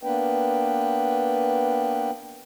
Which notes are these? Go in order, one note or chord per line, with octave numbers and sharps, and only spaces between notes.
A#3 B3 D4 B4 G5